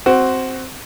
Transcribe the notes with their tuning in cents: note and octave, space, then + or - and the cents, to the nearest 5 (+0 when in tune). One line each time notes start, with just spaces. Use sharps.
C4 +0 F#4 +10